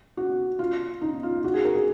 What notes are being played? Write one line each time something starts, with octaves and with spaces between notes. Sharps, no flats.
F#4
F4
D#4
F4
F#4
G#4
A#4
G#4